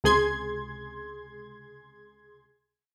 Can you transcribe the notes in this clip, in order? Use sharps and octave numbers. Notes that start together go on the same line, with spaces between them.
C#2 C3 G#4 C6 G#6